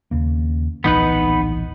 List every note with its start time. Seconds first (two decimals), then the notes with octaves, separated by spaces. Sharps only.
0.11 D#2 C#3 A#3
0.84 D1 A#1 E3 B3 D#4 B4